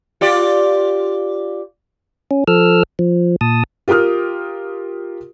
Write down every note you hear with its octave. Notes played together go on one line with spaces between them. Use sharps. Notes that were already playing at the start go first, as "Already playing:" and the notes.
F4 G4 D5
C#4
F3 A4 E6 F6
F3
A#2 A5 D#6
F4 G4 A#4 D#6 F6